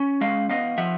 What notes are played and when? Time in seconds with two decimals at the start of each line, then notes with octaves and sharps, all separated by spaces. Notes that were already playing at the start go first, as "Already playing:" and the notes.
Already playing: C#4
0.21 G#3 D#5 F5
0.49 B3 D#5 F5
0.78 F3 E5 F#5